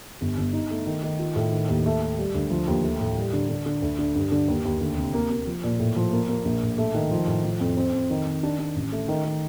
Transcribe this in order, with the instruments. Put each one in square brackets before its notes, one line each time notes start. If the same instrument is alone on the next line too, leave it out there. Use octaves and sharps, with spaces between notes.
[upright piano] G1
G1
D#4
A3
D#3
D#3
F4
A2
D#3
D#2
A3
A3
G3
D2
F3
D#2
A3
A2
G3
D3
D3
D3
D2
D3
G2
D3
D#2
D#2
D2
C3
A#3
A#3
F3
A#2
A2
F3
A#3
A#3
A#1
A2
A3
D#3
F3
A2
F3
F2
C4
F2
D#3
D#3
D4
D4
A1
A3
D#3
D#3